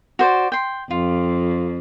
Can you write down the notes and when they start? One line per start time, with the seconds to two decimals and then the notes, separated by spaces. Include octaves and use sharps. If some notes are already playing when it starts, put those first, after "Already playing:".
0.19 F#4 C5 D5
0.52 G5 C6
0.91 F2 F4